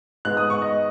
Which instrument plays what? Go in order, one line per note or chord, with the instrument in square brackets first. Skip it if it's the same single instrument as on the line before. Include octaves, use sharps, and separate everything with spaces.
[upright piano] G#2 G#3 B3 F#6
D#6
C#6
D#5